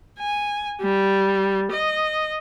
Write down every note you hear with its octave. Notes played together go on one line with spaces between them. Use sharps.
G#5
G3
D#5